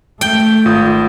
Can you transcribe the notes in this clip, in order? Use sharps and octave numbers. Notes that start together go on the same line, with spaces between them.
A3 G5
G#1 F4 D#6